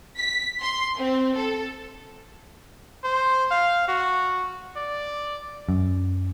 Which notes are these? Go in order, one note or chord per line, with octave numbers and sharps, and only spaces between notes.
B6
C6
C4
A4
C5
F5
F#4
D5
F#2